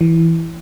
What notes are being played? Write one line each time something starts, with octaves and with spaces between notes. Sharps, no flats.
E3